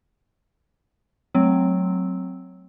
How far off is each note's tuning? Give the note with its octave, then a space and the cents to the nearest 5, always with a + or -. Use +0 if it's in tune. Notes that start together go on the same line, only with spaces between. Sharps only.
F#3 +0 A3 -20 C4 +0